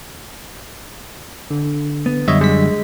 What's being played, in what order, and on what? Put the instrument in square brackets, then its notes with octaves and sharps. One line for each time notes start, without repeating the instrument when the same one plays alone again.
[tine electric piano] D3
[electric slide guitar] B3
[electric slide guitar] F#2 D3 G3 [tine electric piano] C#5 D#5 E5
[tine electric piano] G#3 B6